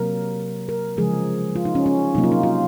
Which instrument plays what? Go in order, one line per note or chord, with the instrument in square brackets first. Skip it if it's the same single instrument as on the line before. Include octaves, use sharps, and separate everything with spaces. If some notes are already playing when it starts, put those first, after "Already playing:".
Already playing: [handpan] C3 F#3 A#3 A#4
A#4
C#3 F3 G#3 G#4
F4
D#4
C#4
C#4
C3 F#3 A#3 D#4
F4
D#4
F4